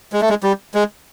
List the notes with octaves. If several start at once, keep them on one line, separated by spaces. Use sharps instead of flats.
G#3
A3
G#3
G3
G#3